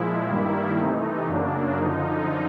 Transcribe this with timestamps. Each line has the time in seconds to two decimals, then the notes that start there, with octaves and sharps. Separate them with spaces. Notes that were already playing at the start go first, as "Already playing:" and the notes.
Already playing: A#2 F3 G#3 E4
0.26 G2 D#3 G3 A#3 E4
0.77 C3 E3 A3 D#4
1.28 F#2 C#3 F#3 A#3 D4
1.78 F#2 D3 F3 D#4